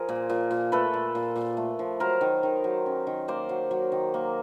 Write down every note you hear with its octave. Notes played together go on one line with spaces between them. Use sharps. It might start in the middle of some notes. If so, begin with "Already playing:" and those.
Already playing: F3 G#4 A#4
A#2
A#2
A#2
A3 A4 B4
A#2
A#2
A#2
A3
F3
F#3 A#4 C5
D#3
D#3
F#3
C#4
D#3
A#3 C5 D5
F#3
F#3
D#3
A#3